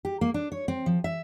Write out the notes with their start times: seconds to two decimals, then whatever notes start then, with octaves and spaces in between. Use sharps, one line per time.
0.05 G4
0.21 A#3
0.34 D4
0.52 C#5
0.68 C4
0.86 F3
1.04 E5